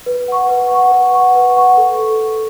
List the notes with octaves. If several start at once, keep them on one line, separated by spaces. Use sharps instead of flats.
B4
F#5 C#6
B4
F#5 C#6
B4
F#5 C#6
B4
F#5 C#6
A4